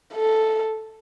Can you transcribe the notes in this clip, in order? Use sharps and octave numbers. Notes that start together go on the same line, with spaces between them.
A4